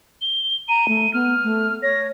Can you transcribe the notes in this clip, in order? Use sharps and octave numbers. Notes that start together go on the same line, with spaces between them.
G7
A#5 D#7
A3
B3 F6
A3
C#5 A#6